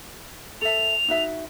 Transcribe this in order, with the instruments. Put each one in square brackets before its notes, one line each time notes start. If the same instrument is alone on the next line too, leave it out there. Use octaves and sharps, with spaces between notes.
[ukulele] A4 E5 [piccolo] F7
[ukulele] D#4 F#4 E5